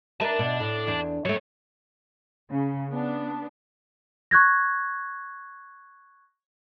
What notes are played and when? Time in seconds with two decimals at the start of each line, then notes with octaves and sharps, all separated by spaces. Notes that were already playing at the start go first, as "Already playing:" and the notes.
0.21 A#4 B4 D5 E5 A5
0.39 B2
0.60 A2
0.87 E2 D4
1.25 F#2 F#3 A3 C#5
2.49 C#3
2.91 B3 D4
4.31 C#6 F#6 G#6 A#6